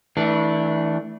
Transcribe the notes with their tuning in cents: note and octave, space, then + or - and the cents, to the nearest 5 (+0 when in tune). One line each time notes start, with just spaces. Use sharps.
E3 -30 A3 +0 D4 +0